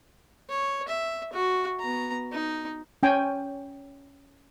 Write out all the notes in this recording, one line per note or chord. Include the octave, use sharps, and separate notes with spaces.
C#5
E5
F#4
B3 A#5
D#4
C#4 G5 G#5